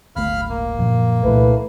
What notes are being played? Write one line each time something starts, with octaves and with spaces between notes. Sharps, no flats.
D1 G1 A3 F5 B5 F6
A#3
F#2 A#2 F3
C2 A#2 E3 A3 B4